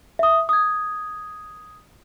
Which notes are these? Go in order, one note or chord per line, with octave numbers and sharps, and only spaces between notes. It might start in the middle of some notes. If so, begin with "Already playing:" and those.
E5 D#6
D#6 G#6